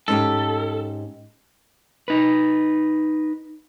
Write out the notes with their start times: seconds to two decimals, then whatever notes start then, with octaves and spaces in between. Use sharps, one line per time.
0.08 G#2 C#4 G4 A4
2.08 D#4 B4